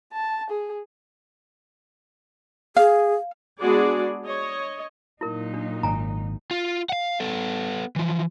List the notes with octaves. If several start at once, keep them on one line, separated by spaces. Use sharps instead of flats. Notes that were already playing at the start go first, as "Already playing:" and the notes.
A5
G#4
G#4 F5
G#3 B3 D4 F#4 G#4 D5
C#5 D#5
A#2 F#3 D#4 E4 A#4
D4
G#1 G#5 A#5
F4
F5 F#5
B3 A4
E3 F3